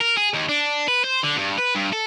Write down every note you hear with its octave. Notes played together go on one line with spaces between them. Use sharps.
A#4
G#4
D#2
D4
B4
C5
D3
G2
B4
G2
A4